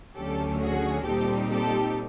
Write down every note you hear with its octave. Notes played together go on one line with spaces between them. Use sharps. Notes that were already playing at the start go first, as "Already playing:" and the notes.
D2 D3 F#3 A3 C#4 G4 A4
F#4 G#4
A#2 G3 C4 D#4 G4 A4
G4 A4